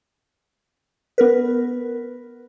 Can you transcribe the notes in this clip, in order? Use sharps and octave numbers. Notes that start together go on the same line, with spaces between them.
B3 A#4 B4